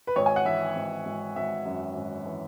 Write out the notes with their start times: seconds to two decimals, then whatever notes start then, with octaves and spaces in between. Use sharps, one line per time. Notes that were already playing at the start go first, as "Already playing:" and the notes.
0.07 B4
0.16 G#1 C#5
0.26 G#5
0.36 F#5
0.45 E3 E5
0.75 G#1
1.05 G#1
1.36 G#1 E5
1.65 F#2
1.95 G#1
2.26 E3